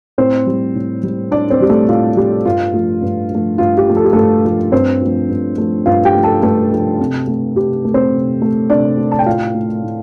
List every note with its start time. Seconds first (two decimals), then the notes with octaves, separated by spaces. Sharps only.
0.18 A2 C4 C5
0.47 G3
0.75 A2
1.03 G3
1.32 A2 D4 D5
1.50 C4 C5
1.61 G3 G4
1.69 A3 A4
1.89 A2 F4
2.16 G3 G4
2.45 G2 F4
2.74 F3 A3
3.02 G2
3.31 F3 A3
3.58 G2 F4
3.77 G4
3.87 F3 A3
3.97 A4
4.05 G4
4.13 G2 A3 A4
4.45 F3 A3
4.72 G2 C4 C5
5.01 F3 A3
5.29 G2
5.57 F3 A3
5.86 G2 F4 F5
6.05 G4 G5
6.14 F3 A3
6.24 A4 A5
6.42 G2 A3 A4
6.71 F3 A3
7.00 C3
7.27 A3
7.56 C3 G4
7.85 A3
7.94 C4 C5
8.14 C3
8.42 A3
8.69 C3 D4 D5
8.98 A3
9.12 A5
9.19 G5
9.26 A2 F4 F5
9.55 A3
9.83 A2